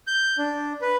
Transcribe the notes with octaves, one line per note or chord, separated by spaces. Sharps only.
G6
D4
B4